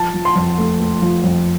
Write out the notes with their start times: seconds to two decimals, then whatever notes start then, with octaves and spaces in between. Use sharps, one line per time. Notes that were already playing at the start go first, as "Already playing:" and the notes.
Already playing: F3 A5
0.14 F3
0.25 C6
0.35 F2
0.58 A3
0.81 A3
1.02 F3
1.24 F2